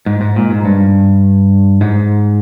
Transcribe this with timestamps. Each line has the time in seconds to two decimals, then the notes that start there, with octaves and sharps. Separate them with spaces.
0.06 G#2
0.21 G#2
0.36 A#2
0.50 G#2
0.65 G2
1.81 G#2